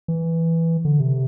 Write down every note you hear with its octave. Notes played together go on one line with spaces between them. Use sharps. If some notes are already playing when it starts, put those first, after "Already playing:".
E3
D3
C3